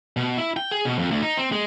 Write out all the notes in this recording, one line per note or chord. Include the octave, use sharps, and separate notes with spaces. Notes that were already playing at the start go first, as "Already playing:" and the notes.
B2
E4
G5
G#4
B2
F2
D2
D#4
C4
G#3